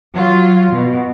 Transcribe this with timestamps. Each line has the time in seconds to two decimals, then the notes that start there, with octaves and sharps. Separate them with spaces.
0.15 F#3 F4
0.72 B2